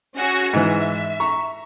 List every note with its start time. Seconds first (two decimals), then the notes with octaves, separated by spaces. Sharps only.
0.17 C#4 F#4 G#4
0.53 G#2 E3 E5
1.20 A#5 C#6